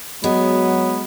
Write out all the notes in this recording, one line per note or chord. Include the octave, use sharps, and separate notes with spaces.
F#3 G#3 B3